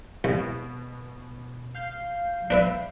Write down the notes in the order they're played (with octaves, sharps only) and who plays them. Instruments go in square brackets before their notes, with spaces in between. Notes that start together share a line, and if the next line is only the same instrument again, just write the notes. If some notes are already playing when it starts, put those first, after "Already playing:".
[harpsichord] C2 [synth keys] B2
[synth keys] F5 G6 C7
[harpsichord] D4 B4 E5